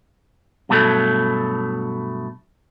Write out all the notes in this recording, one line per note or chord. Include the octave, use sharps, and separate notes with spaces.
G2 B2 F#3 G3 A3